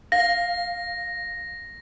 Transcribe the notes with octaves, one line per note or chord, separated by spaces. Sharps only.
F5 A#6